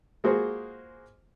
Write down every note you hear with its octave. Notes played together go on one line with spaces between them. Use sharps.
G#3 A#3 F4 F#4 G#4 C5